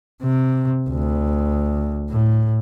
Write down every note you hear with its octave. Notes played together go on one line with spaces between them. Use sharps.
C3
D2
A2